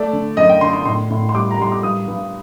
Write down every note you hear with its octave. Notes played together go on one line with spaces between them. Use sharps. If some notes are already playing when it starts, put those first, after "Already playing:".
Already playing: A3 D5
D3
F#2 D#5
G5
D3 C6
C6
A2 C6
A2
C6
G3 D6
A#5
G3 C6
D6
G2 D#6
G2